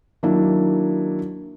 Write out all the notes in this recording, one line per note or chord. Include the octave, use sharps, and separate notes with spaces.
D#3 F#3 A#3 D4 E4